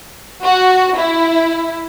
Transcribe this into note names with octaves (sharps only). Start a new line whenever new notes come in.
F#4
E4